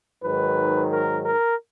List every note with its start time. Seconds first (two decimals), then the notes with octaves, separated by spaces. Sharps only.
0.22 G#2 D#3 F#3 B4
0.90 A#4
1.24 A#4